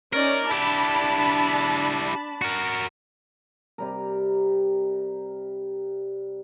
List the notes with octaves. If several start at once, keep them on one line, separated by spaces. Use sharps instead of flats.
C#4 D#4 A#4 D5
D4 E4 G4 A5 B5
F#4 A#4
C3 G3 A#4